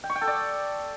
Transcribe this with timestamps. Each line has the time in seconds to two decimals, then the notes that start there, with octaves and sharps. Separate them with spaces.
0.04 G5
0.10 C#6
0.16 G5
0.21 A4
0.27 D5